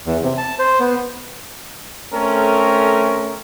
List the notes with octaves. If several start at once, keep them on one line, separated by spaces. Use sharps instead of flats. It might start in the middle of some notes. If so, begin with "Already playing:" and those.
E2
C3
A5
C5
B3
A3 C4 C#4 A4 A#4